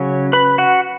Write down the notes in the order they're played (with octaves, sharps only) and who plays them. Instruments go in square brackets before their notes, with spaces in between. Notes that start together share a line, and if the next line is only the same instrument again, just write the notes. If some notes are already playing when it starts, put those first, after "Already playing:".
Already playing: [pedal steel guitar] C#3 F#3 C#4 C#5 C#6
B4 B5
F#4 F#5